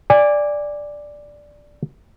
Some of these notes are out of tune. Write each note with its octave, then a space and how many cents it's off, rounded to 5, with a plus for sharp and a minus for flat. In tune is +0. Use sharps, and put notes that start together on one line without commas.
D5 +0 G#5 -25